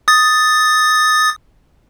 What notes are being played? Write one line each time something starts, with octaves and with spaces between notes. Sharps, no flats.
D#6 A6